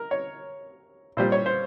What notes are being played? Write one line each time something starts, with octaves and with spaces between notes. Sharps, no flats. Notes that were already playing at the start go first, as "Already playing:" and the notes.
Already playing: A#4
C#5
A#2 G3 C5
C#5
C5